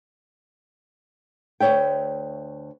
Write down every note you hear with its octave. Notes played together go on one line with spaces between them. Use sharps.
D2 F3 C#5 E5 G5